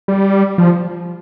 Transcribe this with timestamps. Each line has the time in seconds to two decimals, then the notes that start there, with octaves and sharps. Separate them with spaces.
0.08 G3
0.58 F3